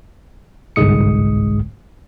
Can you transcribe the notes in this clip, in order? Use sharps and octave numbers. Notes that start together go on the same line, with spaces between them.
G1 C2 G#2 G#3 D#6 C#7